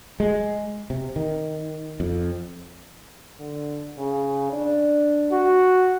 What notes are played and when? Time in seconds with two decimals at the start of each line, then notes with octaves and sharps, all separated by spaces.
0.20 G#3
0.90 C3
1.16 D#3
2.00 F2
3.40 D3
3.98 C#3
4.53 D4
5.32 F#4